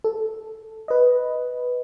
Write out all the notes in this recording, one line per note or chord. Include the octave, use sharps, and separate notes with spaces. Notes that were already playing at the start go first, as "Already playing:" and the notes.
A4
B4 D#5